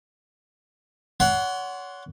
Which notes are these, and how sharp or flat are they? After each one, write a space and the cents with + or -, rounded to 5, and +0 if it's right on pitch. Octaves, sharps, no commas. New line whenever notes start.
C#5 +35 F#5 +0 C6 +0